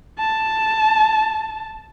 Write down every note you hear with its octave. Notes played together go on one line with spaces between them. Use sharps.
A5